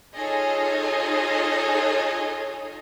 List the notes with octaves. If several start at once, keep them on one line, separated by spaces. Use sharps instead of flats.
D#4 F4 G#4 A4 C#5 D#5